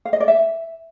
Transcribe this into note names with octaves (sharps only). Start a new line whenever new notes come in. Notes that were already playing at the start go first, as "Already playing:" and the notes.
F5
D#5
D5
E5